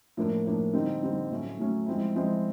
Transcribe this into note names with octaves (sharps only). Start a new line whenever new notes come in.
A2 F3 A#3 D4
A2 F3 A#3 D4
D3 G3 C4 D#4
D3 G3 C4 D#4
A2 F#3 A3 C#4
A2 F#3 A3 C#4
F3 G#3 C4 E4
F3 G#3 C4 E4